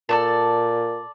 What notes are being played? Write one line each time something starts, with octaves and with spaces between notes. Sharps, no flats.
A#2 A4 D5 A5